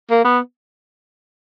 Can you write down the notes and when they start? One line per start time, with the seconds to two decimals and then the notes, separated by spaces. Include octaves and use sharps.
0.11 A#3
0.24 B3